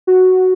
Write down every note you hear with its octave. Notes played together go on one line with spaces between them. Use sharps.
F#4